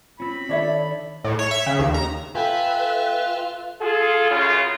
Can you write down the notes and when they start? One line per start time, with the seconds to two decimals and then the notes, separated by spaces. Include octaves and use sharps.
0.20 C4 C#4 F4 B5
0.49 D#3 D4 A4 C#5 D5 E5
1.24 A2
1.39 C#5
1.51 E5
1.66 C#3
1.79 D#2
1.94 A#5
2.35 F4 A4 B4 E5 G5 G#5
3.81 F4 G#4 A4
4.30 F#2 C#3 F4